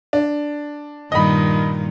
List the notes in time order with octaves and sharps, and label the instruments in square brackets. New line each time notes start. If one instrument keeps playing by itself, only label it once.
[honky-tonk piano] D4
[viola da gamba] G2 A#2 D#3 [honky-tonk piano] D#5 B5